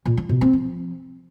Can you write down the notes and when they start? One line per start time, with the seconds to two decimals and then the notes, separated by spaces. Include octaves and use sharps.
0.05 A#2
0.17 F3
0.29 B2
0.41 C4
0.53 F3